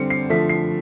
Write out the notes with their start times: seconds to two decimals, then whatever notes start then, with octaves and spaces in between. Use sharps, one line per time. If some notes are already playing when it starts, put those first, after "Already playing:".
Already playing: D3 G3 C4 C#7
0.10 C7
0.30 D3 F3 A3 B6
0.49 C7